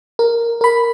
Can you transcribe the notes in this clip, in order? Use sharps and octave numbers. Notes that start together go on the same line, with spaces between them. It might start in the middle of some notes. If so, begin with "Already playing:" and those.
A#4
A#4 B5